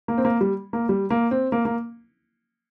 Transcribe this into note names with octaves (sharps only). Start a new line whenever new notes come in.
A#3
C4
A#3
G3
A#3
G3
A#3
C4
A#3
A#3